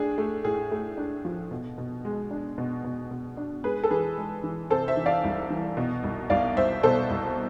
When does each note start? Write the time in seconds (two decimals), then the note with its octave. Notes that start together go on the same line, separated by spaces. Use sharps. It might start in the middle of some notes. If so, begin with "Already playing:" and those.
Already playing: A2 D4 G#4
0.18 A3
0.45 A2 G#4
0.72 A3
0.97 D4
1.25 F3
1.51 B2
1.78 B2
2.05 G#3
2.31 D4
2.58 B2
2.84 B2
3.11 B2
3.37 D4
3.64 G#3 G#4 B4
3.83 A4
3.90 E3 G#4 B4
4.18 G#3
4.44 E3
4.70 C3 A4 C5
4.88 C5 E5
4.97 E3
5.06 D5 F5
5.24 C2
5.50 E3
5.77 B2
6.04 C2
6.30 C2 D5 F5
6.57 C2 C5 E5
6.83 B2 A4 C5
7.10 C2